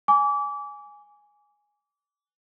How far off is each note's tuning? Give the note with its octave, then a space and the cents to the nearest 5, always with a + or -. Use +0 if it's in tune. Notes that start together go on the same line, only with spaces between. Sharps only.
G#5 +0 D6 -30